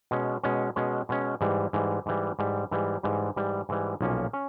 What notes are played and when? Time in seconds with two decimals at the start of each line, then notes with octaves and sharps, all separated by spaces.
0.11 B2 G#3 C#4
0.44 B2 G#3 C#4
0.76 B2 G#3 C#4
1.09 B2 G#3 C#4
1.41 G#2 E3 G3
1.73 G#2 E3 G3
2.06 G#2 E3 G3
2.39 G#2 E3 G3
2.71 G#2 E3 G3
3.03 G#2 E3 G3
3.36 G#2 E3 G3
3.69 G#2 E3 G3
4.01 B1 A#2 F3 A#3 C#4
4.33 C#4